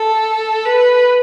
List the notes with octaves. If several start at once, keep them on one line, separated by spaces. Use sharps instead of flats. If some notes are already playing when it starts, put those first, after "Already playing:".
Already playing: A4
B4